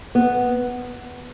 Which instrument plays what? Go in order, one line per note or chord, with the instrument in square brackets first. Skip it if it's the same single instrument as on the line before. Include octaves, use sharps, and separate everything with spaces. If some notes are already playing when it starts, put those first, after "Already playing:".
[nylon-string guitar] B3